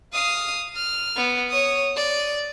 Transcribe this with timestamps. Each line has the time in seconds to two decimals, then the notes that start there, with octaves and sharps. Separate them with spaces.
0.13 F5 D#6
0.76 F6
1.16 B3
1.50 C#5 D#6
1.96 D5